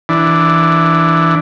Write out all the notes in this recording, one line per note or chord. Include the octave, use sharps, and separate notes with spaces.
E3 D4